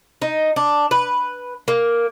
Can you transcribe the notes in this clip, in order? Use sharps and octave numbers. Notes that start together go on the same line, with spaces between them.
D#4
D4
B4
A#3